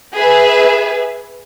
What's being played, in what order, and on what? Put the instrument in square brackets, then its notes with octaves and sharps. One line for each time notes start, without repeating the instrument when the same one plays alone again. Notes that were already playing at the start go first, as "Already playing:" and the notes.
[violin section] G#4 B4 E5